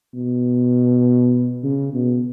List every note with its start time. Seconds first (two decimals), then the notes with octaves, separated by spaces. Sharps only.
0.14 B2
1.63 C#3
1.94 B2